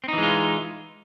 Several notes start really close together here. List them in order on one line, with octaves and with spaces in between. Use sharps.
C4 D#4 E3 G#3 F4